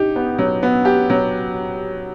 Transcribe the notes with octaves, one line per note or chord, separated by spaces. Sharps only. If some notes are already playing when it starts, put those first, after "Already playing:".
Already playing: D#4 G4
B3
F#3
B3
G4
F#3